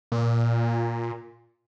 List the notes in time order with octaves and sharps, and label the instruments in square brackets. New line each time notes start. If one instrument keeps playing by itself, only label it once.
[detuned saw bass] A#2